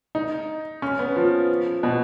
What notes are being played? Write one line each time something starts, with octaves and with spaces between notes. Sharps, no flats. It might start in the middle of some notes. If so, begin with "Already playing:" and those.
D#4
C#4
B3
F3
B2